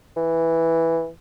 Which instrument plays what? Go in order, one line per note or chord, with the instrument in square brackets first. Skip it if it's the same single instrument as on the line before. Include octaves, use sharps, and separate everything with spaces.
[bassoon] E3